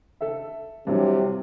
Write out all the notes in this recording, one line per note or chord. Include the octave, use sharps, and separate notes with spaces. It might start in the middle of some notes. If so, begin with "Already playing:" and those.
A4 E5
G2 C3 E3 F#3